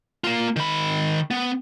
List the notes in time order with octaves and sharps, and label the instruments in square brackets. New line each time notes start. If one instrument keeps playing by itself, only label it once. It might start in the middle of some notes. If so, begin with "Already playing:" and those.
[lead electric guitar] A#3 F4
D#3 B5
B3